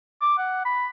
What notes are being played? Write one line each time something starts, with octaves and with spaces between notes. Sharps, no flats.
D6
F#5
B5